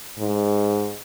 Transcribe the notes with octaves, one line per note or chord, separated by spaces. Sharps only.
G#2